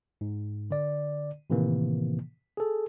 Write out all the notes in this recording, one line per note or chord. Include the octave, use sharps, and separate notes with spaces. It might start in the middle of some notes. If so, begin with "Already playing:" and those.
G#2
D3 D5
A2 C3 D#3 E3 A#3
G#4 A4